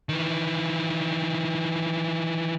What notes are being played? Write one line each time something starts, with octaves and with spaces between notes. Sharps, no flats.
D#3 E3